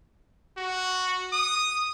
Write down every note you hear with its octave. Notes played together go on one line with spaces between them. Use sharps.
F#4
D#6